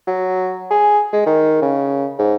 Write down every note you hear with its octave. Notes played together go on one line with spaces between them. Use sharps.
F#3
G#4
G#3
D#3
C#3
G#2